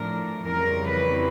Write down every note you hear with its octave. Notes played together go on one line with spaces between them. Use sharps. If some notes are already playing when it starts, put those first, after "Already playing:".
Already playing: A2 F3 A3 D4 A#4
F2 C#3 E3 G3 C4 A#4
B4